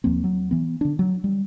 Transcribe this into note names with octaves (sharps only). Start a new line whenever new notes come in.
D#2 F3 A#3 C4
F#3
E3 B3
D3 D4
F#3
G3